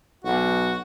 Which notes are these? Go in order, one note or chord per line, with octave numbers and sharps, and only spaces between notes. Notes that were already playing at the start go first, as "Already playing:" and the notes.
B1 F#4